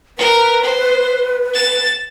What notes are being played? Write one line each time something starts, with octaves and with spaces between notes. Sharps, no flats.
A#4 B4
C5
A6 E7